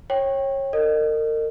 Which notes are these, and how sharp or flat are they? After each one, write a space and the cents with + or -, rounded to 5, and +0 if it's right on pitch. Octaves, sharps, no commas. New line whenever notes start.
C#5 -25 G5 +0
A#4 -35 D#5 -25